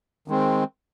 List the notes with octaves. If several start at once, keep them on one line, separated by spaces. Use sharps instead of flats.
D#3 G#3 C4